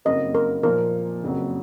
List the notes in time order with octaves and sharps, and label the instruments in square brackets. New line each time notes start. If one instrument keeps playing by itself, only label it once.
[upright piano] F#1 F2 C#3 F#3 A#3 [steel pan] D#5
[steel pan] A#4
[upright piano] A#2 F3 A#3 [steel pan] A#4
[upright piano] F#1 F2 C#3 F#3